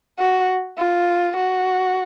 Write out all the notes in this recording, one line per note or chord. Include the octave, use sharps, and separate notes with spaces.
F#4
F4
F#4